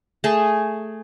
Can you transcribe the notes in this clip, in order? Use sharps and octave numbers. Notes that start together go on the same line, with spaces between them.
A3 G#4